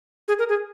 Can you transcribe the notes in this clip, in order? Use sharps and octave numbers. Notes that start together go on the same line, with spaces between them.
G#4
A#4
G#4